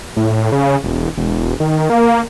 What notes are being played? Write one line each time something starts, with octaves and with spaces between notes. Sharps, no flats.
A2
C#3
E1
E1
D#3
A#3